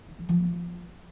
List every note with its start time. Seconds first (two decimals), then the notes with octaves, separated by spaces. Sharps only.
0.08 D#3
0.18 F3
0.29 F3
0.39 A#3
0.49 F4